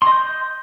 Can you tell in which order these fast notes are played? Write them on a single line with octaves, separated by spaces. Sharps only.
C6 D#5 G6